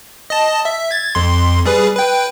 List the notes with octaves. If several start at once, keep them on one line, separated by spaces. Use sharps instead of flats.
D#5 A5
E5
G#6 A6
F2 C6
G3 G#4 B4
B4 G5